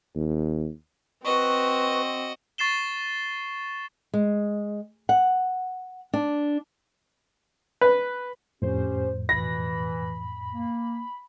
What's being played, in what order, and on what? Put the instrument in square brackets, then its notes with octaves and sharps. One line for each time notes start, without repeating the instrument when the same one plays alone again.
[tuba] D#2
[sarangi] C4 [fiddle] F#4 D#5 [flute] B4 [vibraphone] C#6
[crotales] C#6 A6 C7 E7 G7
[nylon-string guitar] G#3
F#5
D4
[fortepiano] B4
[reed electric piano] F2 A2 [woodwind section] C#4 G4 [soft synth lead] C5
[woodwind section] B2 E3 [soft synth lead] B5 [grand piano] A#6
[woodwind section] A#3